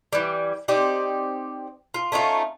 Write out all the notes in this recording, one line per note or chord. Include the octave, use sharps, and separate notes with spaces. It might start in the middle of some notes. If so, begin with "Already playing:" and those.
E3 G3
C4 D#4 G4 D5
F4
A3 C#4 D#4 F4